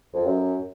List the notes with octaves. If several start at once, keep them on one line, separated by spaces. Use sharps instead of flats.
F2
F#2